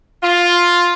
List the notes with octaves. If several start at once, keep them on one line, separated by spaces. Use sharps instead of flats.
F4